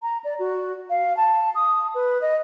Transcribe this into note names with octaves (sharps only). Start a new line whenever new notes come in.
A#5
D5
F#4
F5
A5
D#6
B4
D#5